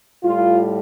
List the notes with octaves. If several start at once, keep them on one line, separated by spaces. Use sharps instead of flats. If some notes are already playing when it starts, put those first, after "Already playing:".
A2 G3 F4